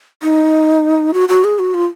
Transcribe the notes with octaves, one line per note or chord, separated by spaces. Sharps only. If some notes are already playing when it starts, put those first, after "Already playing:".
D#4
F#4
F#4
G#4
F#4
F4